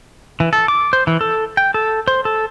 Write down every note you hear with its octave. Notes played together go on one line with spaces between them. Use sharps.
E3
A4
D6
C5
E3
A4
G5
A4
C5
A4